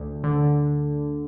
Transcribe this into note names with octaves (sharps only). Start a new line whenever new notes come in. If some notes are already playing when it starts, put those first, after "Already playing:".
Already playing: D2
D3